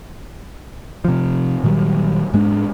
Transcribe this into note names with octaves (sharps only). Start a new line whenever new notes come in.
C3 F3
A#2 D#3 F#3 G3
G#2 G#3 D4